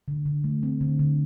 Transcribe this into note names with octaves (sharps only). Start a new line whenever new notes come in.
D3
D3
A3
C4
D3
D3